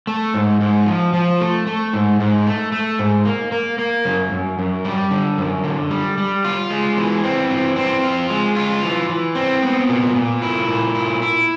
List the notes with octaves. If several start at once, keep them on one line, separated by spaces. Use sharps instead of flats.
A3
G#2
G#2
F3
F3
A3
A3
G#2
G#2
A3
A3
G#2
A#3
A#3
A#3
F#2
F#2
F#2
G3
D3
F#2
D3
G3
G3
F4
G#3
E3
C4
E3
C4
F4
G#3
F4
E3
E3
C4
B3
A#2
A#2
E4
A#2
E4
E4